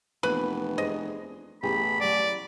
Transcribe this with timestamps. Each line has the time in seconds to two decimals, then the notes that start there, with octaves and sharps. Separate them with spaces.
0.23 F1 E3 A#3 B3 B4 B5
0.78 D4 G#4 C5 D#5
1.63 A1 B2 G4 G#4 B5
2.00 F#3 A3 D5